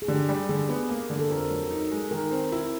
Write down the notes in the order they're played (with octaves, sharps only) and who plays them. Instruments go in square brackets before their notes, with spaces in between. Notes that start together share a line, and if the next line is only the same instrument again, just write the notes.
[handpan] G#4
[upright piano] D3 [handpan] G4
[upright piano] G3
[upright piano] D3 [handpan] G#4
[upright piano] B3
A#3
D3
[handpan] A4
[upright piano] F2 [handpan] A#4
[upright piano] F#3
D#4
G#3
[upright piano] D#3 [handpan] A#4
[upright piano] C4
E4